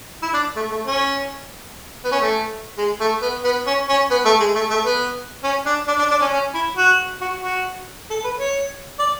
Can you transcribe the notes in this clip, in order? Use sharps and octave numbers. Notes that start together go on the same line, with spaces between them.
E4
D4
A3
A3
C#4
B3
C#4
A3
G#3
A3
B3
B3
C#4
C#4
B3
A3
G#3
A3
A3
B3
C#4
D4
D4
D4
D4
C#4
C#4
E4
F#4
F#4
F#4
A4
B4
C#5
D5